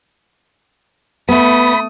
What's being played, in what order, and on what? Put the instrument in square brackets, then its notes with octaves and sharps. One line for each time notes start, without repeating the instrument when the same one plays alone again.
[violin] A3 D#6 [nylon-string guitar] B3 [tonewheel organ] B5